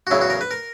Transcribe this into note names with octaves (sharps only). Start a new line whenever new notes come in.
F#4
E2 C#3 F#3 B3 E4
F#4
A#4
B4
A#4